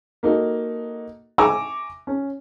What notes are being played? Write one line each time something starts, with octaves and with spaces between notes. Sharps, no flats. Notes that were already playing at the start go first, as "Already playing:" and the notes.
A#3 D#4 F#4 A4
E5 G#5 A#5 C#6 D6 E6
C#4